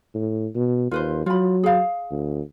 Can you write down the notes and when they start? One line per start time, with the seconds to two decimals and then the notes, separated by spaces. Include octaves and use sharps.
0.15 A2
0.55 B2
0.91 D#2 F4 B4 C5
1.26 F#3 F4 B5
1.63 G#4 F5
2.11 D2